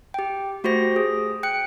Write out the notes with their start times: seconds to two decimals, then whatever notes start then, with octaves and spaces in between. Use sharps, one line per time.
0.14 G4 G5
0.64 A3 F#4 G4 C5 A#6
0.96 G#4
1.43 G5 F#6 C#7